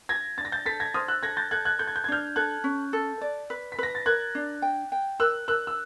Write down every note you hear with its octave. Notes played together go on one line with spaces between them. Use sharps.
F4 G#6 A#6
D4 A6
A#6
G6 A6
A4 A6 B6
G#6 A#6
C5 D#6 F6
E6 F#6
A4 G#6 A#6
G6 A6
A4 F#6 G#6
F#6 G#6
A4 G6
G#6
G6
G#6
D4 F6 G6
A4 F#6 G#6
C#4
A4
D5
B4
B6
B4 A#6
A6
A#4 F#6 G#6
D4
G5
G5
A#4 E6 F#6
A#4 E6 F#6
E6